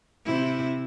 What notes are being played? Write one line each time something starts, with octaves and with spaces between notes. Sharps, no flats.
C3 E4